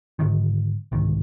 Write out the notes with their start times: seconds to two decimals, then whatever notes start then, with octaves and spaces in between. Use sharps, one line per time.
0.19 G#2 D3 D#3
0.92 G1 C2 G#2 D#3